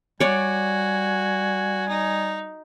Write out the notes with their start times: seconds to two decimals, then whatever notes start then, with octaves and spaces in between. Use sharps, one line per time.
0.20 G3 F#4 C#5 D5 G#5
1.89 D#4